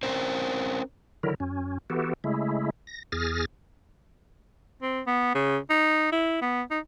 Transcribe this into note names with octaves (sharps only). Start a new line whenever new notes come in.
C4 C#4 A#4 C5
D3 D#3 F#3 E4 A#4
F#2 C#4
E3 B3 F#4 G4 A4
C#3 G#3 A3 E4
A#6
E2 G#4 F6 A6 A#6
C4
B3
C#3
D#4
E4
B3
D#4